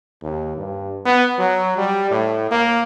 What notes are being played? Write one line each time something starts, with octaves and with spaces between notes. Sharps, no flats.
D#2
G2
B3
F#3
G3
A2
A#3